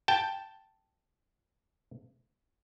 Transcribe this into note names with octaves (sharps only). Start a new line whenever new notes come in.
G5 A5